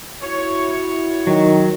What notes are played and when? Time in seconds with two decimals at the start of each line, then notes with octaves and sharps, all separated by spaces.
0.22 E4 F#4 C#5
1.27 D#3 F#3